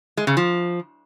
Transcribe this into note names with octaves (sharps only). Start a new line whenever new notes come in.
G#3
C#3
F3